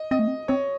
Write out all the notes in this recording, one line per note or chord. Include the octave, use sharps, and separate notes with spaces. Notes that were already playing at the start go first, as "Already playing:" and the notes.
Already playing: D#5
C4 D#5
A3
C4
C4 C#5